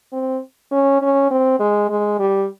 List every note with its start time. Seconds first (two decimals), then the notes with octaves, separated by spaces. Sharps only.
0.12 C4
0.71 C#4
1.02 C#4
1.31 C4
1.60 G#3
1.89 G#3
2.20 G3